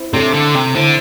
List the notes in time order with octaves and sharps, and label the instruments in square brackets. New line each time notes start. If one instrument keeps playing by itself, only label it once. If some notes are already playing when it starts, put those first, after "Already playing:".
Already playing: [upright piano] C4 E4
[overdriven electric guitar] C3 [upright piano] A3 D4
[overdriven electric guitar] D3
C3
[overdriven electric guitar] D3 [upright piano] C4 E4